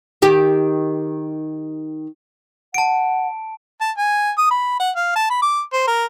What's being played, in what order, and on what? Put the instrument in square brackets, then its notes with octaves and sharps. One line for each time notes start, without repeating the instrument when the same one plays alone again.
[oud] D#3 G4
[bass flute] F#5 [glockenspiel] A5 D7
[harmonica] A5
G#5
D#6
B5
F#5
F5
A5
B5
D6
C5
A#4